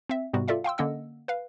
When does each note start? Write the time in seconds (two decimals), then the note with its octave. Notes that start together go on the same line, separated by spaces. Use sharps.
0.09 C4 E5
0.33 G#2 C3 G3 B3 F#4
0.48 F4 A4 D5 E5 F5
0.64 F5 G5 C6 E6
0.78 D3 A#3 C#4 D#5 F#5 E6
1.28 B4 F5